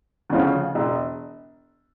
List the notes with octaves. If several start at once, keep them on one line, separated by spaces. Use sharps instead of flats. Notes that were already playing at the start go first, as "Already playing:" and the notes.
D2 C#3 F3
E1